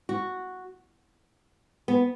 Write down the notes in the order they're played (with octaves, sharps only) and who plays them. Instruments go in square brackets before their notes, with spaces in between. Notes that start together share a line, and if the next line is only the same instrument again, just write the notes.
[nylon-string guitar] F#4
B3